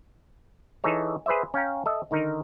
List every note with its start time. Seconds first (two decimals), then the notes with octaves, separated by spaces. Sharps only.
0.84 E3 D#4 G#4 A4 C#5
1.26 G#4 B4 C5 D5 E5
1.54 C#4 F5 G5 A#5
1.86 A4 D#5 E5
2.11 D3 D#3 D#4 A#4